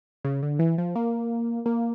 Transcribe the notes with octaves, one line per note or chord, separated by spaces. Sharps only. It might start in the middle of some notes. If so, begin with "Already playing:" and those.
C#3
D3
E3
F3
A#3
A#3